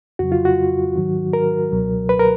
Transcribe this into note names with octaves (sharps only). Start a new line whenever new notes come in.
F2 C#3 F#3 F#4
F4
F#4
G#2 D#3 F#3
A#4
C#2 B2 F#3
B4
A#4